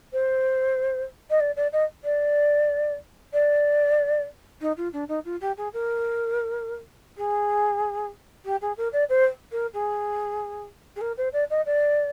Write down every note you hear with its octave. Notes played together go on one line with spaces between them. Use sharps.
C5
D#5
D5
D5
D#5
D5
D5
D#4
F4
D4
D#4
F4
G4
G#4
A#4
G#4
G4
G#4
A#4
D5
C5
A#4
G#4
G#4
A#4
C5
D5
D#5
D5